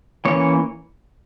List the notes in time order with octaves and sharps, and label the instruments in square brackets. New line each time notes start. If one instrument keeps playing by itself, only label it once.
[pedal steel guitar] E3 A#3 C#4 C#5